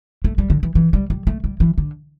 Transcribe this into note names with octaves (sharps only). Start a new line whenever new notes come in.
A3
G3
D3
E3
E3
G3
G3
A3
G3
E3
D3